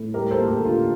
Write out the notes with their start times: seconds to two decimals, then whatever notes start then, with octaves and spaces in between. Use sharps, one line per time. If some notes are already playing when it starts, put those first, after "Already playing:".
Already playing: A2
0.14 G3 G4 A#4
0.31 A4 C5
0.37 A#3
0.47 G4
0.59 D3
0.65 F4